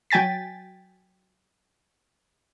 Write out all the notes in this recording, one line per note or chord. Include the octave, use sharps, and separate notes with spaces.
F#3 G5 G#5 A6 B6